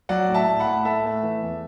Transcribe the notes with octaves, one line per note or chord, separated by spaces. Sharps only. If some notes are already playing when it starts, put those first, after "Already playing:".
F#3 D5 F#5
A2
E5 A5
A2
F#5 B5
A2
A3 E5 A5
A3
E3
E2